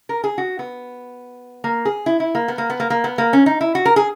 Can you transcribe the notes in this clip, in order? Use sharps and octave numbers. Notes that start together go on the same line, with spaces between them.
A#4
G#4
F#4
B3
A#3
G#4
E4
E4
A#3
B3
A#3
B3
A#3
A#3
B3
A#3
C#4
D#4
E4
F#4
A#4
G#4